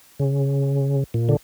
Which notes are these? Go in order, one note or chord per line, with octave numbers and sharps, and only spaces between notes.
C#3
A#2
D3